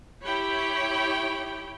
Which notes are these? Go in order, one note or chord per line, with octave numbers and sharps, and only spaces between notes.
E4 G4 C#5 G5 B5